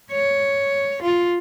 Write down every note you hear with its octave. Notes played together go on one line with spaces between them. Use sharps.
C#5
F4